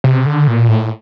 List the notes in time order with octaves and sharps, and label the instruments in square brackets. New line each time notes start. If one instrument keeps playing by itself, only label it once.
[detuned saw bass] C3
D3
A#2
A2